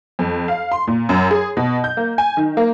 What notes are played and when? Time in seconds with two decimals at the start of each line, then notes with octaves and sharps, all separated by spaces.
0.19 F2
0.48 F5
0.72 C6
0.87 A#2
1.09 F#2
1.31 G#4
1.57 B2
1.84 G6
1.97 A#3
2.18 G#5
2.37 D#3
2.57 A#3